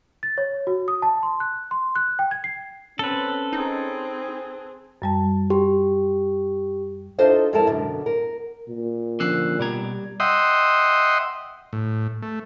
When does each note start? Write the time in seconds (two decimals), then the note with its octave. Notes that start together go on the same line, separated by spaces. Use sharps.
0.23 A6
0.38 C#5
0.67 F#4
0.88 D#6
1.02 A5
1.23 C6
1.40 F#6
1.71 C6
1.96 F#6
2.19 G5
2.31 G#6
2.44 C7
2.99 C4 C#4 A4 B4
3.53 C4 D#4 G#4
5.02 F#2 G3 A5
5.50 G4 C6
7.18 D4 D#4 F4 A4 C5 D#5
7.53 F2 G#3 E4 A4 A#4 A5
7.67 F#2 B2 D3
8.06 A#4
8.69 A#2
9.20 D3 F3 C#4 E6 F#6 C7
9.59 B2 G3 G4 A#5 G#6
10.20 D#5 E5 F#5 G5 C6 D#6
11.73 A2
12.22 A3